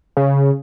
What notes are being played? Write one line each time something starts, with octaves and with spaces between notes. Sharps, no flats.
C#3